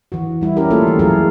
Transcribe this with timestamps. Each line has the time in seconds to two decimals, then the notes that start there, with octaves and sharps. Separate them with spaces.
0.12 E3 F#4
0.41 G3 E4
0.57 C#4 E4 G4 A#4
0.70 A3 A#3 F4 A4
0.87 E3
0.99 F#3 F4 G#4 A#4